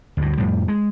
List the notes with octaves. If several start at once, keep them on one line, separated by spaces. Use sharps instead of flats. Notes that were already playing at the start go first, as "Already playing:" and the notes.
D2 G2
F2 A2 G3
G#3